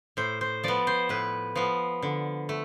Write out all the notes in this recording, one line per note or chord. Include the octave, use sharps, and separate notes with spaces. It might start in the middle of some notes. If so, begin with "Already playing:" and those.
A2 C5
C5
F3 B3 D5
C5
A2 B4
F3 B3
D3
A3